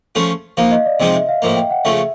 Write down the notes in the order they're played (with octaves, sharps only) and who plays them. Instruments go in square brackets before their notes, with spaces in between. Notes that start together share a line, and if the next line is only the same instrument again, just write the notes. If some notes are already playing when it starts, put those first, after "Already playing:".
[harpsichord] F3 A3 C#4 F4
[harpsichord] F3 A#3 D#4 [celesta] F5
[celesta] D#5
D5
[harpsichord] C3 F3 G#3 C4 D#4 [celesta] D#5
[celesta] E5
F5
[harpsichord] A2 F3 A#3
[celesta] G5
F#5
[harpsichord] C#3 F3 A3 C#4 [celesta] E5